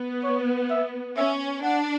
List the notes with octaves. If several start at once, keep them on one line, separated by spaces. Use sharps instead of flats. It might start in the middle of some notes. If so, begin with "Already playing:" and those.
Already playing: B3
C#5
E5
C#4 E5
D4 F#5